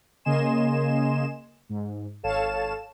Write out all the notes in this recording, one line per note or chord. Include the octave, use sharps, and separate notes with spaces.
C#3 A#3 D#5 G#5 C6 E7
G#2
G#1 A4 C#5 F5 A5 E7